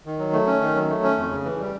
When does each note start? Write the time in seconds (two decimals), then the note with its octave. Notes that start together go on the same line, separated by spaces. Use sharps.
0.06 D#3
0.19 F#3
0.33 A3
0.47 C#4
0.61 D#3
0.75 F#3
0.90 A3
1.03 C#4
1.17 F2
1.31 C#3
1.45 E3
1.60 G3